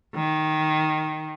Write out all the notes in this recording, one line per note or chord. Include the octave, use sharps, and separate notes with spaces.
D#3